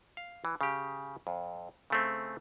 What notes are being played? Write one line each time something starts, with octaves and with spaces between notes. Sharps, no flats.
F5
E3
C#3 G4
F2
C#3 A3 C4